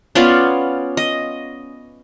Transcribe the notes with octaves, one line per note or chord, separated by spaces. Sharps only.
B3 C#4 F4 D5
D#5